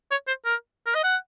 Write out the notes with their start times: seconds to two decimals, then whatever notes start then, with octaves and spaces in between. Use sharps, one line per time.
0.11 C#5
0.28 C5
0.45 A#4
0.87 A#4
0.95 D#5
1.04 F#5